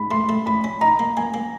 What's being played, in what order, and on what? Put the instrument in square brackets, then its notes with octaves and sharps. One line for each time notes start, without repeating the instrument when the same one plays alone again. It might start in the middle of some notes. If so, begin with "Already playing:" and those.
Already playing: [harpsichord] G#2 [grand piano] B5
[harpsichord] A3 [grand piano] C6
[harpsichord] A3
[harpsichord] A2 [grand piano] B5
[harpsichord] C#4
[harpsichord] D#4 [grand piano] A#5
[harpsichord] A#3
[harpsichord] A#3 [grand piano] G#5
[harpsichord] A#3